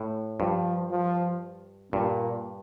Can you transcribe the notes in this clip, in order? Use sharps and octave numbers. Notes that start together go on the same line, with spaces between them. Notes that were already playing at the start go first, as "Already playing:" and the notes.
Already playing: A2
G2 F3
F3
G2 A#2